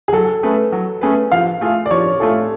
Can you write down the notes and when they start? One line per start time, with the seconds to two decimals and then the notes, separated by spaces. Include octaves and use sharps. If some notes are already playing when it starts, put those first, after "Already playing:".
0.08 G#4
0.13 F#3 A4
0.43 A3 C#4 G#4 B4
0.72 F#3
1.01 A3 C#4 G#4 B4
1.32 F3 F5
1.61 A3 F4 G#4
1.86 D5
1.91 F3 C#5
2.20 A3 F4 G#4 A4